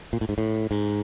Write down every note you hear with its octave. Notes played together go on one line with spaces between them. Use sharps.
A#2
A2
G#2
A2
G#2